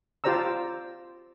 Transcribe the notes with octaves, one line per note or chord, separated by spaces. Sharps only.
F4 G4 C5 D5 A#5 E6